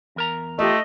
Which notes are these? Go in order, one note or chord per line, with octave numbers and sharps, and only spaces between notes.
E2 A#4 A#5
A3 F4 G4 D#5